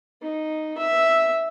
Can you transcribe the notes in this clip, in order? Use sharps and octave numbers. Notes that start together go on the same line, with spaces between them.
D#4
E5